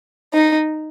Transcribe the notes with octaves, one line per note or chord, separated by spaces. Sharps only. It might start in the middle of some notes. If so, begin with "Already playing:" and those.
D#4